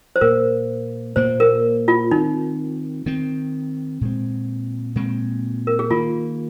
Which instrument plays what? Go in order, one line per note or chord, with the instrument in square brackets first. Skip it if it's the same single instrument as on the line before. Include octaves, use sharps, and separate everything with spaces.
[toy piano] C5
[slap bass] A#2 A#3 [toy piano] A#4
[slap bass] A#2 A#3 [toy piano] C5
[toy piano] A#4
F4
[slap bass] D#3 C4 [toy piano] D#4
[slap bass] D#3 C4
A#2 G#3 C4
A#2 G#3 C4
[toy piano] A#4
G#4
[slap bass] D#3 A#3 [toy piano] F4